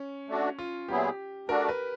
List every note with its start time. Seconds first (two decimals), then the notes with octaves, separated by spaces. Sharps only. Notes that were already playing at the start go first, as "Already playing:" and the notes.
Already playing: C#4
0.28 A3 D4 F#4
0.59 F4
0.88 A#2 F#3 B3 E4 G4 G#4
1.49 A3 D4 F#4 A#4
1.69 B4